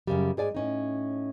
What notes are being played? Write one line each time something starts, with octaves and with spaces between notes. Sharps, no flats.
F#2 C#3 G3
G#2 G#4 D5 G#5
A2 C#4 D#4